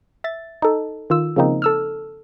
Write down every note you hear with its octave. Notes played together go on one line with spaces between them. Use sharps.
E5 A6
D#4 A4
D#3 F4 E6
C#3 F3 A#3 C4 D#4
A4 E6 F6